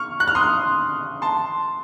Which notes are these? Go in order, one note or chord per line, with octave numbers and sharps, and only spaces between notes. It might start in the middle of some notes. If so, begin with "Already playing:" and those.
Already playing: C#6 F6
F#6
F6
C6 D#6
A5 C6